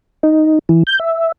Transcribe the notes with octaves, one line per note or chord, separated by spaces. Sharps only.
D#4
E3
G6
E5